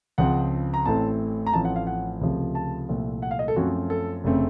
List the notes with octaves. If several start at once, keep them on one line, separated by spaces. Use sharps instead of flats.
C#2 C#3 F3 C4 F#5
A#5
A1 A2 A3 C4 A5
A#5
A1 A2 F3 C4 A5
F#5
F5
F#5
C#2 C3 F3 A3
A5
C2 A#2 F3 A3 C4
F#5
F5
D#5
A4
F#2 F3 A3 C4 F#4
A4
F1 C#3 A3 C4